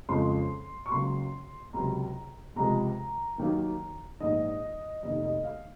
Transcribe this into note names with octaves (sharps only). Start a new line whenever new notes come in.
F2 C#3 F3 G#3 C6
C#6
C#2 C#3 F#3 A#3 C6
C#2 C3 F#3 A#5
C#2 C3 F3 G#3 A#5
D#2 D#3 F#3 A#3
A#1 G#2 D#3 D#5
F1 D#2 D#3 D#5
D#5
F5